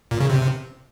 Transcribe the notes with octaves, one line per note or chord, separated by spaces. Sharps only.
A#2
C#3
C3